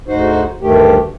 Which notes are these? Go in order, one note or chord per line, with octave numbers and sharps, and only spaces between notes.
D2 G#2 D#4 F#4 C5
D2 G2 D#3 A3 G4